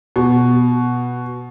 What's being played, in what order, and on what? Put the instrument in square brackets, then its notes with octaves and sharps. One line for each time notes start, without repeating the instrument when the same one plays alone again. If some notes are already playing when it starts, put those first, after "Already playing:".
[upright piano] B2